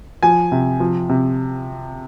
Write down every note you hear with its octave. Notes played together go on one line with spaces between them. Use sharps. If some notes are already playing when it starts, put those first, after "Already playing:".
F3 G#5
C3
F3
C3